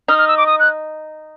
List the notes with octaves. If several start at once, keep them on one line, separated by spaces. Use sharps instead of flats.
D#4 F6
F6
E6
D6
D#6
F#6